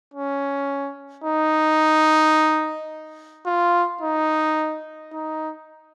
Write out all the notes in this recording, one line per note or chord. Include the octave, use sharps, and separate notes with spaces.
C#4
D#4
F4
D#4
D#4